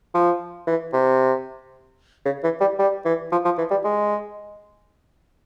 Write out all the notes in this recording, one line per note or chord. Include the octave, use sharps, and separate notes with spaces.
F3
E3
C3
C#3
E3
G3
G3
E3
F3
F3
E3
G3
G#3